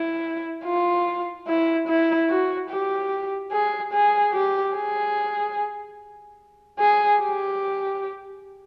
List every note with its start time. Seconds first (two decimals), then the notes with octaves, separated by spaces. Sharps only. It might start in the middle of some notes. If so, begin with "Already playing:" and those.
Already playing: E4
0.65 F4
1.48 E4
1.88 E4
2.29 F#4
2.70 G4
3.52 G#4
3.93 G#4
4.33 G4
4.74 G#4
6.79 G#4
7.20 G4